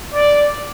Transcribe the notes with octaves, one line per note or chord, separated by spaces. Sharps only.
D5